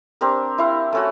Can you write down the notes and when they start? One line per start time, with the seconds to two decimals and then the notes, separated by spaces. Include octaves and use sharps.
0.21 C4 D4 G4 A#4
0.58 E4 F5 G5
0.93 A3 C#4 F#4